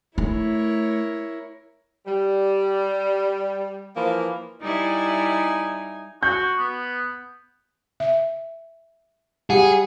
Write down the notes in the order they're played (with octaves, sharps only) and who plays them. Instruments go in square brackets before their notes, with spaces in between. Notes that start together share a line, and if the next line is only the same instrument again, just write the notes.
[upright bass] A3 [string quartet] E4 A#4 C#5
[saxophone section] G3
E3 F3 A#3
[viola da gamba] G3 E4 [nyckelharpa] D#4 G#5
[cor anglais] F#4 [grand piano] G6
[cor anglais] B3
[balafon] E5
[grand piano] G3 [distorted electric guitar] G#4 [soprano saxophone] F#5